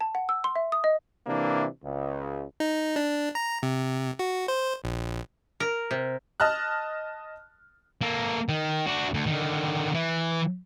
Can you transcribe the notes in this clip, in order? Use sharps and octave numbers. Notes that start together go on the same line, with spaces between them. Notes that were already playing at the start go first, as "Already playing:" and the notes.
A5
F#5
E6
C6
E5
D#6
D#5
C3 E3 A#3 D4
C#2
D#4
D4
A#5
C3
F#4
C5
A#1
A#4
C3
D#5 A5 F6 F#6
A#3 A4
D#3
D4 F#4
D2
D3 D#3
E3